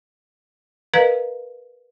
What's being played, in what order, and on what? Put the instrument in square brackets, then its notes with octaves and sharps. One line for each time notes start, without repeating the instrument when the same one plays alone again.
[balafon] A#4 B4 D#5 F5 A#5